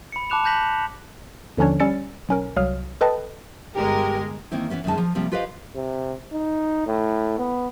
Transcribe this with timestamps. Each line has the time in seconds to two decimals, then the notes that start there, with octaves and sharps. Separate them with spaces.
0.12 B5 C#7
0.30 A5 B5 D6 F#6 E7 F7
0.44 A5 F#6 G6 A#6 B6 F#7
1.57 D#2 D3 F3 C#4 D4 C#5
1.80 G3 C#4 E6 A6 C#7
2.29 B1 C#4 A#4
2.57 C2 F#3 F5 D#6 F6
3.01 A4 B4 D#5 G5 A5
3.76 G1 G#3 G4 A#4
4.51 D#3 E3 A#3 C4 E4
4.70 E3 F3 B3 C#4
4.84 F#2 A#2 D3 D#3 G#3 A5
4.98 F3
5.15 C3 F3 G3 A#3 C4
5.32 F4 G4 B4 C5 D#5 F5
5.76 C3
6.33 D#4
6.87 A2
7.39 B3